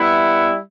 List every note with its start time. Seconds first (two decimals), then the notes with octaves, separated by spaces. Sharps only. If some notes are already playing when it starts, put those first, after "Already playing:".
Already playing: G3 B3 E4